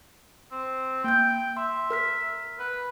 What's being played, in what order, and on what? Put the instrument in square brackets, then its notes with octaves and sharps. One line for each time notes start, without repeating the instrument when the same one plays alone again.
[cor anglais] C4
[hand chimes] A#3 G6 [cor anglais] G5
[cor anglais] E5 [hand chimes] C6
[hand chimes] A#4 F6 B6
[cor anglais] B4